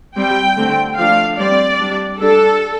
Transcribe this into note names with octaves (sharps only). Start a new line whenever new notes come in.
G3 C4 G5
D3 A3 C4
F3 A3 D4 F5
G3 C4 D5
G3 D4
G3 D4 A4